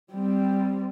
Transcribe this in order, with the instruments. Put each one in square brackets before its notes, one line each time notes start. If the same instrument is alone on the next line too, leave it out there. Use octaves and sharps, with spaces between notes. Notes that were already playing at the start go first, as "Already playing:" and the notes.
[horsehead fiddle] G3 C4